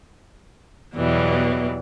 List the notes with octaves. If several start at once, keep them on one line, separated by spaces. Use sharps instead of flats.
E2 B2 E3 F#3 G3